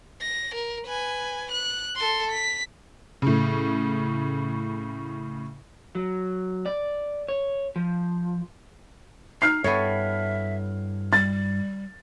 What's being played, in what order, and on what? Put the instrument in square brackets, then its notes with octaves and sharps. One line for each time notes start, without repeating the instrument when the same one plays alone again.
[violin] A#6
A#4
B4 G#5
F#6
A4 C6
B6
[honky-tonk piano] A2 C#3
[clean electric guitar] F#3
D5
C#5
F3
[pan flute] D#4 [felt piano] F6 C7
[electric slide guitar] G2 E4 G5 [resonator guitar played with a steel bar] B3 A4 C#5 [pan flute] E5
[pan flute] G3 [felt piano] A6